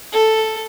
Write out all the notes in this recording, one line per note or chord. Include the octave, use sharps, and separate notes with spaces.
A4